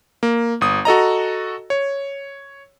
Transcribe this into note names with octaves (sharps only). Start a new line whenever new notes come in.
A#3
G1 D#6
F#4 A4 D#5 A#5
C#5